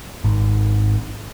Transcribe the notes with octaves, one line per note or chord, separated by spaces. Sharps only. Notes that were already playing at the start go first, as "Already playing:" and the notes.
G#1